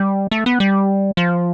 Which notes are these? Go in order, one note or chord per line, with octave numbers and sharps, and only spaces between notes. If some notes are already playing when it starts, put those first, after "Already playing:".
Already playing: G3
A3
B3
G3
F3